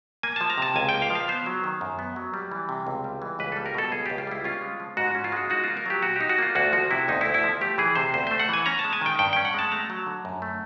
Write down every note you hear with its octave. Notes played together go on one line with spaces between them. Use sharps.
A#3 G#5
F3 A5
A#5
C3 A5
C#2 G#5
G5
A#3
F5
F3
F5
B3 C5
F#3
D#3
F#2
B3
F#3
G3
E3
C3
C#2
G3
E3
C#2 B4
G3 A4
A#4
B2 A4
C#2 G#4
C#2 G4
F4
G3 E4
C#4 F4
G#3
F3
G#2 F#4
C#4 F#4
F4
G#3 F#4
D#4 F#4
A#3 F4
A#4
F#3 G4
A#2 F#4
D#4 G4
F#4
A#3 F4
D2 F#4
F3 F#4
C3 E4
D2 D#4
E4
D2
E4
F3
A3 G4
E3 G#4
C3 C5
D2 C5
A3 C5
F#5
E3 G#5
C#4 A#5
A5
G#3
G#5
D#3 G5
G2 G5
C#4 G5
F#5
G#3 A5
A3 A#5
F#3
D3
F#2
A3